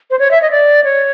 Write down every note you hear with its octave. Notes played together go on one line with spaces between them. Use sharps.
C5
C#5
E5
D#5
D5
C#5